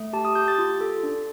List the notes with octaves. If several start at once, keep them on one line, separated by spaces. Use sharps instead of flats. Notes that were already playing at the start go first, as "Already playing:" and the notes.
Already playing: A3
G4 A5
D#6
G4 G6
A6
F4
A4
D4